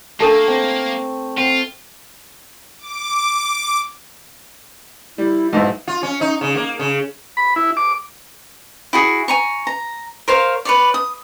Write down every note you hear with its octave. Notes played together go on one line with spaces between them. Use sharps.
A3 A#3 D4 A4 A5
C4
C4 F4
D6
G3 E4
B1 G#2 E4 D#5
F4
C#4
D#4
C#3
A#3
C#3
B5
E4
D6
E4 F#4 G#4
G#5 A#5 C#6
A#5
A#4 C5 C#5 F5
B4 C#5 D5
D#6